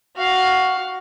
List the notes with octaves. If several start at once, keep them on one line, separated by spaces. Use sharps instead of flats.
F#4 F5